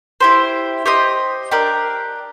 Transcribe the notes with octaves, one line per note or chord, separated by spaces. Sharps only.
E4 G4 C5
G4 C5 D#5
D4 G4 A#4